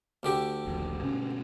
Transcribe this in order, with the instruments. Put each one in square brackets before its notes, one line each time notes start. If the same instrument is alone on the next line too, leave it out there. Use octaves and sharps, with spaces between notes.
[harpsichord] D2 D3 G4
[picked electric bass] D#1 A#1
G2 B2 C#4